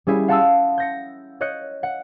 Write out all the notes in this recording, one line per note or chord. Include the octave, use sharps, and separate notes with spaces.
G3 C#4 E4 G#4 E5
F5 F#5 A5 C6 D#6 E6
G6 A#6 C#7
C#5 D#5 F#6 G6 C#7
F#5